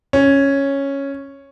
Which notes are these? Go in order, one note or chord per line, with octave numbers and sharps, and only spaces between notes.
C#4